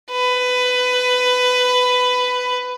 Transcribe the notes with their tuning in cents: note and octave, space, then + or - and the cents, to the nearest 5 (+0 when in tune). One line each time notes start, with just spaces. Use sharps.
B4 +15